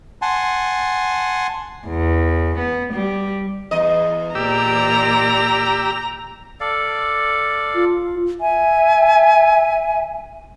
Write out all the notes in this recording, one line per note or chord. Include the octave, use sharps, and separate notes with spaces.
F#5 G#5 A5 C6
E2
B3
G3
E2 D#5
A#2 G4 D5 A#5 E6
A4 D5 F5
F4
E5 G#5